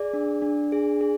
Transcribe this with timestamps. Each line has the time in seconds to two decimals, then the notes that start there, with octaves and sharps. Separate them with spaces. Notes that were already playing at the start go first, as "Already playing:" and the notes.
Already playing: G#4 D5
0.13 D4
0.42 D4
0.72 G#4
1.01 G#4